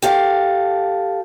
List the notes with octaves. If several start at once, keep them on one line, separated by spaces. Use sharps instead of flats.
G4 A4 F5